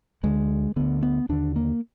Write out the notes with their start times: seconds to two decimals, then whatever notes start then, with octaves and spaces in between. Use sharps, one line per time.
0.23 D2 D3 G#3
0.76 D2 D3 B3
1.03 B3
1.29 D#2 D3 D4
1.56 A#3